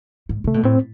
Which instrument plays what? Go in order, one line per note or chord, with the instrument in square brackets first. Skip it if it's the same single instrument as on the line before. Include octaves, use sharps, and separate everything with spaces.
[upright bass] G#2
[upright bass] C3 [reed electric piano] A3
[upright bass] B2
[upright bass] A2 [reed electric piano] C4